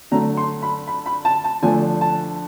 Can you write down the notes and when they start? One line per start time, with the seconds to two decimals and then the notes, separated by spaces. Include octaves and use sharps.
0.11 D3 F#3 A3 A#5
0.37 C6
0.62 B5
0.87 B5
1.06 B5
1.25 A5
1.44 A5
1.62 D3 F3 A3 D4 G#5
2.01 A5